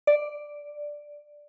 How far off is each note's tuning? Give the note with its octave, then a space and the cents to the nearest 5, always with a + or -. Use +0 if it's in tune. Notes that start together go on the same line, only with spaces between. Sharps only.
D5 +0